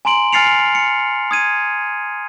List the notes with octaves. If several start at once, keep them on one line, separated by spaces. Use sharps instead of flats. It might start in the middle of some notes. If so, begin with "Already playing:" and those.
G#5 A#5 C6 D7 F#7
G#5 F6 A6 C7 C#7 F7
C#7
D#6 G#6 D#7